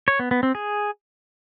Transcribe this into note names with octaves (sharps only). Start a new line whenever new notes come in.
C#5
B3
B3
C4
G#4